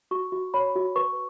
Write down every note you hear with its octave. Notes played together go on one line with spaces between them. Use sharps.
F#4 C#6
F#4
C#5 B5
F#4
B4 C#6